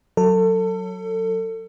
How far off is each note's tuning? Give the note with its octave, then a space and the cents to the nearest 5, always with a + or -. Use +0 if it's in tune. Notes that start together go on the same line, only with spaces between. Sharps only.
F#3 +0 A4 +30